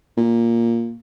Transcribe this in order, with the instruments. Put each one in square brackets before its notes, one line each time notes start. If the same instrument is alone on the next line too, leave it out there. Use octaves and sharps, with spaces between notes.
[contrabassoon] A#2